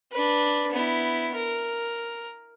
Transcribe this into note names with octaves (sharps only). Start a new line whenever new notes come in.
D4 B4
B3 E4
A#4